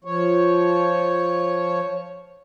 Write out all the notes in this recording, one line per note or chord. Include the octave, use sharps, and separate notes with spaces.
F3 C#5